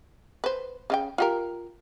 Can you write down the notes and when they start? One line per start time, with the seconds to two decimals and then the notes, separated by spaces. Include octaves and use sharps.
0.44 B4 C5
0.90 C#3 F4 G5
1.18 F4 G4 A#4